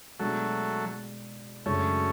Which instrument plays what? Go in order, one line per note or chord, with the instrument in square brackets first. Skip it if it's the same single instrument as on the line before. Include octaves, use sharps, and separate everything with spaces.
[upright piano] B2 G#3 D4 [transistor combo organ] F#3 A3
[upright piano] F#2 C#3 G#3 D4 [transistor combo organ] A3 C#4